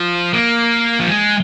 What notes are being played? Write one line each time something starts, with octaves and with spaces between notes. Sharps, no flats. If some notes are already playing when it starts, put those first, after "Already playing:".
Already playing: F3
A#3
F3
G#3